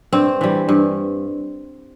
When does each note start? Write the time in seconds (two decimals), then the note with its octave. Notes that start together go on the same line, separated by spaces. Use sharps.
0.13 G2 C4
0.41 E3 G3
0.69 G2